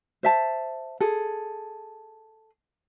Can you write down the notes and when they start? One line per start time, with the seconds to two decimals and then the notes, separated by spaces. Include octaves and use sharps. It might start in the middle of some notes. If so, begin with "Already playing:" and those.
0.23 C5 E5 A5
1.00 G#4 A4